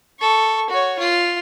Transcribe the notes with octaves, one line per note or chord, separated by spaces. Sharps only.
A4 C#6
F#4 C#5
F4